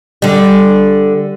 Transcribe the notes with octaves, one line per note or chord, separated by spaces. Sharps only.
D3 G3